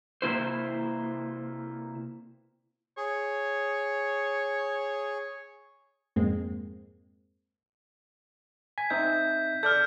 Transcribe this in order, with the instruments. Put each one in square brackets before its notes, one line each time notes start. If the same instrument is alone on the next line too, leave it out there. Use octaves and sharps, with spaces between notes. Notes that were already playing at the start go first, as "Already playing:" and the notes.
[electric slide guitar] C3 A#3 E4 C5
[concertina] G#4 [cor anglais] C#5
[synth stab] F2 G#2 G#3 A#3 C4
[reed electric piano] G#5 [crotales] B6
[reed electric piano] C4 D#4 E5 [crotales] G6
[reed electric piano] A4 D5 [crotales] F6 G6